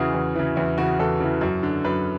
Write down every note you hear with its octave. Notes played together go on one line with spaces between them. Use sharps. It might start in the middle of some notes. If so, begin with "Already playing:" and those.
Already playing: E2 C#3 E3 F#4 G#4
E2
C#3 E3
E2 E4
C#3 E3 F#4
E2 A4
C#3 E3
F#2
D3
F#2 B4